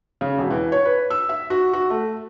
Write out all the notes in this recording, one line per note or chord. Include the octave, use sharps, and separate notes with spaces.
C#3
E1
E3
C#5
B4
E6
E5
F#4
F#4
A3